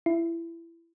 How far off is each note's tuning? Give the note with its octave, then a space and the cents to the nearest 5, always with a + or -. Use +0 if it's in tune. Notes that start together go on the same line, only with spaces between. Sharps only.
E4 +20